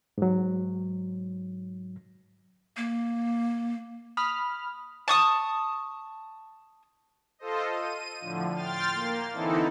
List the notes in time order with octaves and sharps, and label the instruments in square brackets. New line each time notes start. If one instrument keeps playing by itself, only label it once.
[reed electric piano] G#2 F#3
[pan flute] A#3
[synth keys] B5 F6 [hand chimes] D#6
[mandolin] A5 C#6 D#6
[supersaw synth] F4 A4 C5 D#5
D#7
A2 D3 F3
G5 C6 F6 A6
A#3
D3 E3 C4 D#4 E4 A4